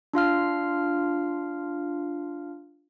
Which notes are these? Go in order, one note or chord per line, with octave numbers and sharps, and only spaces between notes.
D4 F4 F5 F6